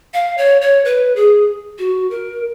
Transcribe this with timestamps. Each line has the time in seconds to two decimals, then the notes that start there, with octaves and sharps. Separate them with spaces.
0.14 F5
0.38 C#5
0.61 C#5
0.85 B4
1.16 G#4
1.79 F#4
2.11 A#4